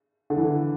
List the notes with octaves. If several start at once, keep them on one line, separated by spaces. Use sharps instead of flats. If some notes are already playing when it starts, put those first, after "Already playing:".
D3
E3